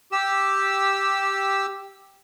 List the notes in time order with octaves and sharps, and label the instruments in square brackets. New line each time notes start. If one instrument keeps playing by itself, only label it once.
[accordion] G4 E6